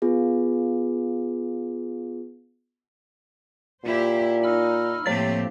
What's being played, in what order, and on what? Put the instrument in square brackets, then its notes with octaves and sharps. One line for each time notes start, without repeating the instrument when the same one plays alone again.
[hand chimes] B3 F4 G#4
[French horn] A#2 [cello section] E4 G4 C5
[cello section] D#4 [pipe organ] B5 E6 F6
[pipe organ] A2 F3 A#3 [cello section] A3 C4 G4 [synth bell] C#5 A6